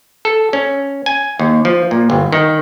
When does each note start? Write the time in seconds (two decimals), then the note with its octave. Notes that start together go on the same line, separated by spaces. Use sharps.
0.25 A4
0.53 C#4
1.06 G#5
1.39 D#2
1.65 F3
1.91 A#2
2.10 G1
2.32 D#3